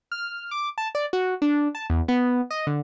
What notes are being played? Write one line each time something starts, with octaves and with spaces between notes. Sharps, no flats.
F6
D6
A5
D5
F#4
D4
A5
E2
B3
D#5
D3